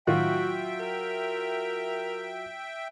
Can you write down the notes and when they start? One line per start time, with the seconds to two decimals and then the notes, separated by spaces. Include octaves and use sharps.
0.07 A2 D#3 F#3 F4 F#4 E5 G5
0.80 A#4